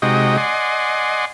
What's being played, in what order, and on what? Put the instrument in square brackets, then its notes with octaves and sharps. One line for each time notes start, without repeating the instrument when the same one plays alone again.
[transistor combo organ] C3 G#3 D#4 F#4 D#5 G5
D5 D#5 F#5 G#5 C6